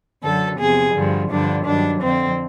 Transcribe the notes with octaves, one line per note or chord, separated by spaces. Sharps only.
F#2 D3 F#3 A4
E2 C3 F3 G#4
G2 D3 F3
G2 D3 F3 D4
G2 D#3 F#3 D4
F2 D3 F3 C4